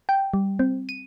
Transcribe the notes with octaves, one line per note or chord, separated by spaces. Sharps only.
G5
G3
C4
D#7